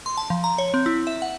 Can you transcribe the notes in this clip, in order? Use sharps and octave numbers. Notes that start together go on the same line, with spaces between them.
C6
A5
F3
A#5
C#5
C4
E4
E5
F#5